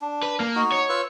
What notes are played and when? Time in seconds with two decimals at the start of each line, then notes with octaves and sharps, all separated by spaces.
0.01 D4
0.23 B4
0.40 A#3
0.55 D#4 F#4
0.72 C#5
0.89 F4 B4 E6